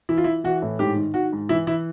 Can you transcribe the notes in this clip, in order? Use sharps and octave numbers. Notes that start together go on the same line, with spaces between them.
E3 E4
F4
E3 E4
E3 F#4
A2
G#2 G4
D#3
D#3 F#4
G#2
E3 E4
E3 E4